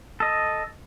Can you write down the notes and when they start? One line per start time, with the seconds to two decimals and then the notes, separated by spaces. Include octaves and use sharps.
0.20 A4 D#5